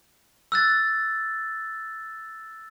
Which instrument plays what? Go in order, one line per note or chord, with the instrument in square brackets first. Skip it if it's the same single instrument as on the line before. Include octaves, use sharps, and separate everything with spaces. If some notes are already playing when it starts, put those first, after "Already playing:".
[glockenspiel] E6 F#6 A6